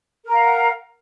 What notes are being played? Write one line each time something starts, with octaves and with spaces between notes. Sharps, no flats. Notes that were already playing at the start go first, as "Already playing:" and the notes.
A#4 F5 F#5 A#5